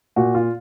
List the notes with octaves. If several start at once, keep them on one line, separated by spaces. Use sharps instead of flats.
A#2 F#4
F4